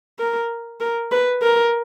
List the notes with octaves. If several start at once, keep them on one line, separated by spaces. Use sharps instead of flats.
A#4
A#4
B4
A#4